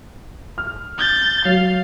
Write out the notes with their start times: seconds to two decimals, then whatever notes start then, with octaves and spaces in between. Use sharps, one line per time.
0.58 F6
0.98 G6 A6
1.45 F#3 F5